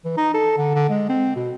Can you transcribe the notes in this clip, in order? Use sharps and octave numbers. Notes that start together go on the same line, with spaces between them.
E3
D#4
A4
D3
D3
G#3
C4
B2